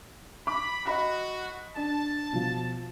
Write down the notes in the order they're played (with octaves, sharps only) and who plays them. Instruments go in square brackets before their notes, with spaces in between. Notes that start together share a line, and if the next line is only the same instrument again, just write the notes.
[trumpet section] B5 [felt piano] D6
[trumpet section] F#4 [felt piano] D#5 B5 B6
[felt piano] D4 [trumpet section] A5
[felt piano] B2 F3